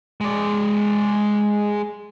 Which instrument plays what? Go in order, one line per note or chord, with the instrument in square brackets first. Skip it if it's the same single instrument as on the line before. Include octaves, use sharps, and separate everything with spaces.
[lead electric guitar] G#3 D5